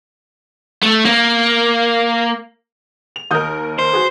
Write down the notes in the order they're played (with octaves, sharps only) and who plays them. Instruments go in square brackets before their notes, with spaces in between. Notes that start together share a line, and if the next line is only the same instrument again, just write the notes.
[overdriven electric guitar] A3
A#3
[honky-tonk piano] F7
[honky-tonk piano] D#2 D#4 A#4 [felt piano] D#6 G6
[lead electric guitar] C5
[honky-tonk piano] F#4 G#4 B4